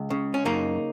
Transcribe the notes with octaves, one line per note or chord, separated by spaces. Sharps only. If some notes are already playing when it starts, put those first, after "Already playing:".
Already playing: C#2
C#3
C#4
F#2 A#3 D#4